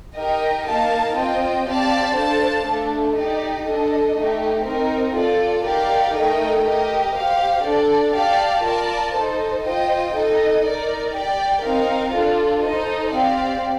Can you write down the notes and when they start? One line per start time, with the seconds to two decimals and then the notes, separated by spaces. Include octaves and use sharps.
0.15 D#4 G4 A#4 D#5 G5
0.66 A#3 D#4 A#4 F5 A5
1.15 C4 F4 C5 D#5 G5
1.65 C4 G4 D5 F5 A5
2.15 D4 A4 C5 F5 A5
2.65 A3 D4 A4
3.15 D#4 G4 D5
3.64 D4 A4 D#5
4.14 A3 D#4 G4
4.64 C4 D#4 A#4
5.14 F4 A4 D5
5.64 D#4 G4 A#4 D5 F5
6.14 A3 D#4 A#4 D#5 G5
6.64 G4 A#4 D#5
7.14 G4 C5 F5
7.64 D4 A4 D5
8.14 G4 D5 F5 A5
8.63 F4 A#4 D5 A5
9.14 D#4 A4 C5
9.63 F4 C5 D#5 G5
10.13 D#4 A4 D#5
10.63 D#4 A#4 D5
11.13 G4 D5 G5
11.63 C4 D#4 A#4 F5
12.13 D4 F4 A4
12.62 D#4 A4 C5 D#5
13.12 C4 G4 D5 F5